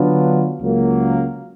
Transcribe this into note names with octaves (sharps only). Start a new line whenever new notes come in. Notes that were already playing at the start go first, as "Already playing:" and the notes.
Already playing: D3 F#3 B3 D4 F4
C#2 C#3 F#3 A#3